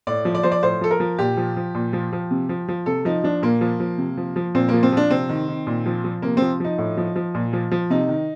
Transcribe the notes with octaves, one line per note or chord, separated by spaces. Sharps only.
A2 D5
F3
D5
F3 C5
D5
A2 C5
F3 A4
A#4
F3
A#2 G4
F3
F3
A#2
F3
F3
C3
F3
F3
C3 A4
F3 D#4
F3 D4
A#2 A#3
F3
F3
C3
F3
F3
A#2 C4
F3 A#3
C4
F3 D4
C3 C4
D#3
D#3
A#2
F3
F3
C3 A#3
F3 C4
F3 D#4
A2
F3
F3
A#2
F3
F3
C3 D#4
D#3